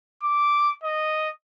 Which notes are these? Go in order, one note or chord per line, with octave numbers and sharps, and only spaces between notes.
D6
D#5